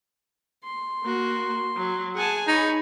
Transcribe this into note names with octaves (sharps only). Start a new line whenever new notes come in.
C6
A#3 F#4
F#3
G#4 F#5 G#5 A5
D#4 C#5 B5